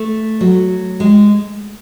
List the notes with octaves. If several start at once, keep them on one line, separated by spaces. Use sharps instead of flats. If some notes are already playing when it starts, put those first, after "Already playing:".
Already playing: A3
F#3
G#3